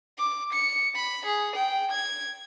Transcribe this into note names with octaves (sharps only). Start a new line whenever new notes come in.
D6
C#7
B5
G#4
G5
G#6